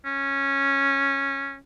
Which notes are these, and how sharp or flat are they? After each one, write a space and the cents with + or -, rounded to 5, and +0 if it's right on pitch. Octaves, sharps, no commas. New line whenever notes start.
C#4 -10